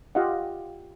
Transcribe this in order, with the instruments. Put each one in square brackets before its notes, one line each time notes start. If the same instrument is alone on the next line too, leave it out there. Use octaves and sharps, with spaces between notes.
[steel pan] F4 G4 D#5 F5 F#5